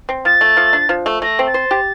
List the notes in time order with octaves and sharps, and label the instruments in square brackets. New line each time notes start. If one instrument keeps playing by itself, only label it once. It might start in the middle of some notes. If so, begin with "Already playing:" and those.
[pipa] C4
[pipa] F3 [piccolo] A6
[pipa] A3
F3
D4
F3
A3
[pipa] A3 [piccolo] A#6
[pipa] C4
[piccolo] A6
[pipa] C5
G4